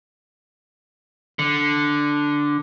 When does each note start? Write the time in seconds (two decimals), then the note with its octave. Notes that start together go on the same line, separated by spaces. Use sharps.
1.39 D3